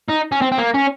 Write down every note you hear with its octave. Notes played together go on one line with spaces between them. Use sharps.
D#4
C#4
C4
C4
A#3
C#4